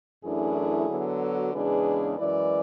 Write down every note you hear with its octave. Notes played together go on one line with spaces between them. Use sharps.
F#2 E3 A3 D4 E4 G#4
D3 F#3 B3
F#4 A4
E2 C#3 G#3 D4 G#4 B4
F#2 E3 G#3 B4 D5